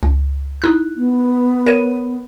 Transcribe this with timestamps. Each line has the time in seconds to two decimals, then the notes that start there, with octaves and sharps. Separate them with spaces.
0.03 C#2
0.62 D#4 E4 F#6
0.96 B3
1.66 A#4 C#5 D#7